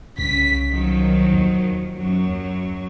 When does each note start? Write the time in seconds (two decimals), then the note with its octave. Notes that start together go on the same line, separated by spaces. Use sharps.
0.18 C2 C#3 B6
0.70 D#3 F3 F#3
1.33 D#2
1.96 F#2 F#3